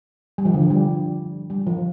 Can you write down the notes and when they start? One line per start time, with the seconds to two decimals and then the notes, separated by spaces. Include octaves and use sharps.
0.38 G3
0.45 F3
0.54 D3
0.61 F3
0.70 G3
1.50 G3
1.67 F3